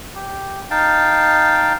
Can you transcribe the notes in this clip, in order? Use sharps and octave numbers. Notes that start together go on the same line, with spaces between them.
G4
D#4 F5 G5 A5